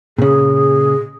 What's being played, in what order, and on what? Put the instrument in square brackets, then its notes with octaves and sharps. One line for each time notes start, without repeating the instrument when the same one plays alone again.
[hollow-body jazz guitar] A#2 C#3 [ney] G#4